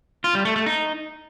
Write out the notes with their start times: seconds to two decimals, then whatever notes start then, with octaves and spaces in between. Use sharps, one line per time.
0.24 F4
0.35 G3
0.45 A3
0.56 A3
0.66 D#4